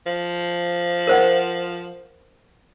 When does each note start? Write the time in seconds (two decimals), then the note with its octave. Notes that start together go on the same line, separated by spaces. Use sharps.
0.06 F3
1.07 A#4 C5 F#5